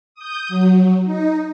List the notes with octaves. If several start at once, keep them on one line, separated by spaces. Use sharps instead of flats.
D#6 G6
F#3
D#4